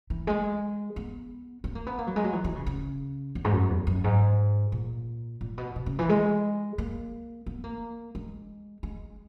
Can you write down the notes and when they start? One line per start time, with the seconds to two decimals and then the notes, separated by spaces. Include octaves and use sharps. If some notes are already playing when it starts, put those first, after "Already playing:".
0.10 E3
0.27 G#3
0.96 B3
1.64 B3
1.75 A#3
1.87 B3
1.99 A#3
2.07 F#3
2.16 G#3
2.24 F#3
2.33 E3
2.44 E3
2.56 C#3
2.66 C#3
3.35 E2
3.44 G#2
3.52 F#2
3.70 E2
3.87 F#2
4.04 G#2
4.72 A#2
5.41 A#2
5.58 B2
5.76 B2
5.86 C#3
5.99 E3
6.09 G#3
6.78 A#3
7.46 B3
7.64 A#3
8.15 G#3
8.83 G#3